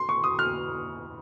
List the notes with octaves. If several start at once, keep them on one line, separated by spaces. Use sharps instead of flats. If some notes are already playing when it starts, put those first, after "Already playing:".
Already playing: C6
C#6
D#6
F6